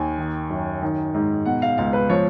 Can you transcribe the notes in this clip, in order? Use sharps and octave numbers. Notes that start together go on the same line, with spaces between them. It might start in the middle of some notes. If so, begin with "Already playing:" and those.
Already playing: D#2 G#5
D#3
F#2
D#3
G#2
B2 F#5
F5
C#2 F5
B4
F3 C#5